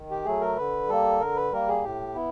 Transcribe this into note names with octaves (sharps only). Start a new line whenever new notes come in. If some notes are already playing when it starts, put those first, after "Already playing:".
Already playing: D#3
G4
F#3 A3 G#4
A#4
D3 B4
G3 A#3 A4
D3 A#4
B4
G3 A#3 A#4
G#4
A2 G4
B3 E4